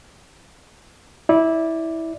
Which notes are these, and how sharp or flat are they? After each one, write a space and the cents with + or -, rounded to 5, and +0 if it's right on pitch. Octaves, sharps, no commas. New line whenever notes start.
E4 -15 D5 +0